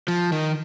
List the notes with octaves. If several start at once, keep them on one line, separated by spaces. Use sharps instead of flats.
F3
D#3